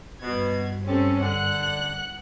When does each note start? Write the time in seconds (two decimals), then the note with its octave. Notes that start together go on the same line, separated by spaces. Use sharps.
0.21 G2 B2 G#6
0.86 C4 C#4 G4 A4
1.21 D3 F#5 F#6